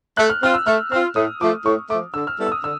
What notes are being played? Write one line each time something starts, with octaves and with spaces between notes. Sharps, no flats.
A3 F#6
F6
C4 F4 F6
E6
A3 F6
C4 F4 F6
A2 D#6
F3 A3 D6
A2 C#6
F3 A3 D6
D3 E6
F6
G3 B3 E4 A4
E6
D#6
D3 E6